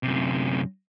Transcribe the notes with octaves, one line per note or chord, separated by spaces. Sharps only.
F#2 C3